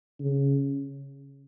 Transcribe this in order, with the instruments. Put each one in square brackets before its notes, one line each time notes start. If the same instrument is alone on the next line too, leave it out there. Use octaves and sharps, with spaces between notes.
[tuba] C#3